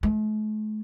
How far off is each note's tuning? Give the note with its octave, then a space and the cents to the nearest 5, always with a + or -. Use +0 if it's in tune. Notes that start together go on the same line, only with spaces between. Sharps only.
A3 -45